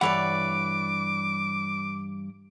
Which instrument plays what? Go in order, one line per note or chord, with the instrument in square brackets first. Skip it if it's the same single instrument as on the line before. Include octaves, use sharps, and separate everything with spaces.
[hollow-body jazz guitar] G2 E3 F#5 [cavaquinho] B4 C#5 D5 [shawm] D6